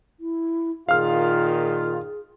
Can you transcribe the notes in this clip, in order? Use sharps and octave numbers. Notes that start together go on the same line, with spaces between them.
E4
A#2 D#3 F4 G#4 F5 F6